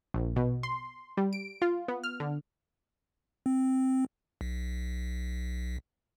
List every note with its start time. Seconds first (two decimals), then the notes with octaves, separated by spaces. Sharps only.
0.14 A#1
0.36 B2
0.63 C6
1.17 G3
1.33 D7
1.62 F4
1.88 B3
2.04 F6
2.20 D3
3.46 C4
4.41 B1